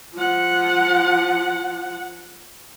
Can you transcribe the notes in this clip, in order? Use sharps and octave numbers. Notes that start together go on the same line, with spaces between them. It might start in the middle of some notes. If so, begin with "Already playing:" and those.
F3 F#5